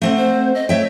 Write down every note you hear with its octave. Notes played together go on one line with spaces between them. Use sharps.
A3 C4 F#5
C5
D#5
A3 C#5 E5 G5